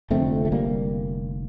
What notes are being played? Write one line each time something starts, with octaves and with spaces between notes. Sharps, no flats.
F1 F2 D3 A3 C4
A3
G3 A#3